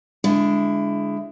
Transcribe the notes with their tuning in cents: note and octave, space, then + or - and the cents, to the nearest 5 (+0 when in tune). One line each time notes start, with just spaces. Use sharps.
D3 -10 G#3 +0 E4 +20